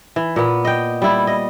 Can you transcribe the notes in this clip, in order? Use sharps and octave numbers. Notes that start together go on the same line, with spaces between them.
E3
A#2 B3
D#5 G5
G3 E4
D#5